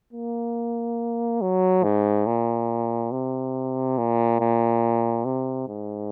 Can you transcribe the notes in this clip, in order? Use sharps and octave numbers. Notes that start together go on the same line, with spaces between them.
A#3
F#3
G#2
A#2
C3
A#2
A#2
C3
G#2